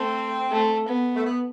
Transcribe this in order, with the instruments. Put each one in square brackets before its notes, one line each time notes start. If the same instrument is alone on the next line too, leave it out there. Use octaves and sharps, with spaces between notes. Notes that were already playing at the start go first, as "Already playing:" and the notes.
Already playing: [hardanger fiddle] A3 [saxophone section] C4
[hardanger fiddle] A3
B3
[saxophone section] A3
B3